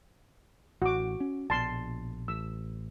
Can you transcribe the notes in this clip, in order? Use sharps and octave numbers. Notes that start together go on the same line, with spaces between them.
A1 F#4 D6
C#4
A#1 B2 A5 C6
A1 E6